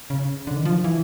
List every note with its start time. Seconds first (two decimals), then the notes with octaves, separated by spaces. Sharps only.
0.10 C#3
0.47 D3
0.56 D#3
0.65 F3
0.84 E3